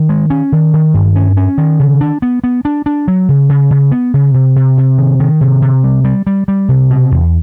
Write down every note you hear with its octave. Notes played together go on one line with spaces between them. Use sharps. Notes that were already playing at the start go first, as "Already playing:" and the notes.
Already playing: D#3
G#3
C#4
D#3
D#3
G2
C#4
C#4
D#3
C#3
D4
B3
B3
D4
D4
F#3
C#3
C#3
C#3
B3
C#3
C3
C3
C3
D#3
D#3
C3
C3
G3
G3
G3
G3
C3
B2
E2